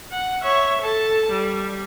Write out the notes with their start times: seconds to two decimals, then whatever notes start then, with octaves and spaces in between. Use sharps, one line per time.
0.11 F#5
0.43 C#5 E5
0.81 A4 A5
1.32 G3